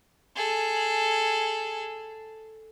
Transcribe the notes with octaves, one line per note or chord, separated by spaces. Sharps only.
G#4 A4